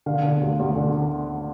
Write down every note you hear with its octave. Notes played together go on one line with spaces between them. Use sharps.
D3 F5
D3
D2
D2
D3